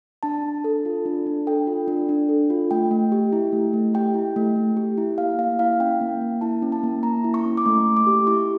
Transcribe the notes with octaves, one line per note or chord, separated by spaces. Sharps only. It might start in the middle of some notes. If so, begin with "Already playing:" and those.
D4 A5
D4
A4
F4
D4
D4
A4 G5
F4
D4
D4
A4
F4
A3 G5
A3
G4
E4
A3
A3
G4 G5
E4
A3
A3
G4
E4
A#3 F5
A#3 F5
E4 F5
C#4 G5
A#3
A#3
E4 A5
C#4
A5
A#3
A#3 A#5
E4
C#6
C#4
D6
A3 C#6
A3
D6
G4
E4 C#6